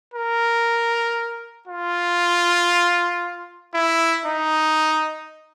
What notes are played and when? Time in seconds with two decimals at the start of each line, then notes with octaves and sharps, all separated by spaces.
0.14 A#4
1.67 F4
3.74 E4
4.25 D#4